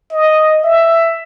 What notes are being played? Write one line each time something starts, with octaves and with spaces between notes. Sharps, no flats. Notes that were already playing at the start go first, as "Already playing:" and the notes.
D#5
E5